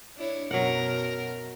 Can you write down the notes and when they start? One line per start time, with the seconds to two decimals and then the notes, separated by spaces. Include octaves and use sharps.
0.17 D4 E4 C#5
0.51 F#2 B2 F#3 A#4 F#5